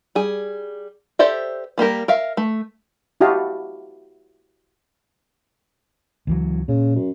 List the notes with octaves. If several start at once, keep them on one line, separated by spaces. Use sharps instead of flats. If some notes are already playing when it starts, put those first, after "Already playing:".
G3 G#4
G4 A4 C5 D5 E5
G3 A#3 G4 A#4
A#4 E5 F5
A3
E4 F#4 G4 D#5 F5 A5
C#2 E3 F#3
A#2 C#3
F#2